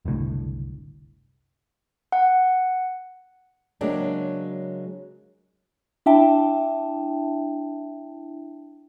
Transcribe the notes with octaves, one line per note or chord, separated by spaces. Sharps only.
F#1 C2 A2 D3
F#5
C#3 F#3 G#3 A#3 C4 D4
D4 E4 E5 G5 A5